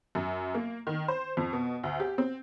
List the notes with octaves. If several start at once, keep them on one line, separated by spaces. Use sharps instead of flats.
F#2
A#3
D#3
C5
F2
B2
D2
G4
C4